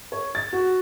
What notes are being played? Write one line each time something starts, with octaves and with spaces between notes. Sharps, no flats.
C#5
A6
F#4